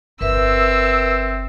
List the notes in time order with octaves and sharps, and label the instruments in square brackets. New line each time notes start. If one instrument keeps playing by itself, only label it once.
[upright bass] G1 [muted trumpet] C4 [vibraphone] A#4 B4 E5 [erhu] E6